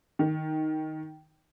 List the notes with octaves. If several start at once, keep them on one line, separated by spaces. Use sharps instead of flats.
D#3